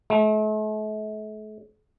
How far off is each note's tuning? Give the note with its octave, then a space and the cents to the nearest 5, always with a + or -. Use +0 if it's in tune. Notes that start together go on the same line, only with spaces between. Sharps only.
A3 -40